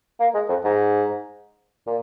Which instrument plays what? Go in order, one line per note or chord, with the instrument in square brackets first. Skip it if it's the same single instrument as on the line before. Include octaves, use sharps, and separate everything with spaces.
[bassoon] A#3
G#3
F2
G#2
A#2